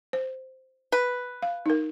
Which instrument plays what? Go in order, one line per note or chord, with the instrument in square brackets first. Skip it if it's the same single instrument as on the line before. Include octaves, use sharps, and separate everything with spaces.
[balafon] C5
[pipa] B4
[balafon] F5
D#4 A#4